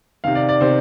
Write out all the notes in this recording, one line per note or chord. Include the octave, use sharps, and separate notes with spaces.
C3 D#3 F5
D5
D5
C3 D#3 C5